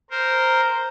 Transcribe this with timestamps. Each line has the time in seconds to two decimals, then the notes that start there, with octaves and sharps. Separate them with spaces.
0.11 A#4 C5